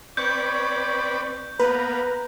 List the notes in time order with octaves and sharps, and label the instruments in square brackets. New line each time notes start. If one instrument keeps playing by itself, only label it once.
[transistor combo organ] C4 B4 D5 [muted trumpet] C#5 [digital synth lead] C#6 [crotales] G6
[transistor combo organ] A#3 B3 [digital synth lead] B4 [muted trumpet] A#5